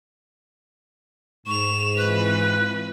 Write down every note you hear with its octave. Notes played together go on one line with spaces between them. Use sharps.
G#2 C#6 E7 F7
E3 C4 F4 B4 F#6